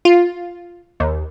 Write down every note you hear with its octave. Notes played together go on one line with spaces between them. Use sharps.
F4
D#2